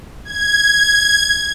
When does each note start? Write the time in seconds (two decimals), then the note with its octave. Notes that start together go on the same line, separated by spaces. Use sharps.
0.25 G#6